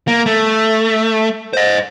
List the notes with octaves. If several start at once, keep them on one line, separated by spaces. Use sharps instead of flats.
A#3
A3
C5 D#5